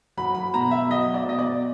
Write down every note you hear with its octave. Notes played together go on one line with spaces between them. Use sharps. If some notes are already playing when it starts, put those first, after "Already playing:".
F#3 B5
B5
B2 A#5
E5
F#3 D#5
D5
B2 D#5
D5